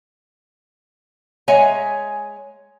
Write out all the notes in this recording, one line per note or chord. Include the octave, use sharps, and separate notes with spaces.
G#3 C#5 E5 F#5 G#5 A#5